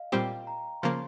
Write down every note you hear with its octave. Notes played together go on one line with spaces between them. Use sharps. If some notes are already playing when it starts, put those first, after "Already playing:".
Already playing: D#5 F5
A#2 G3 C4 G4 G5
A#5
C#3 F3 A#3 C6